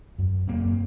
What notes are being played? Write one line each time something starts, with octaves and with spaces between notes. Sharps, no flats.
F#2
F#2 A#3 C4